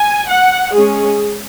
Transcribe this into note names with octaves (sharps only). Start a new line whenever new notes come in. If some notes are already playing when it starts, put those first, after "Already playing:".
Already playing: G#5
F#5
G#3 C#4 G#4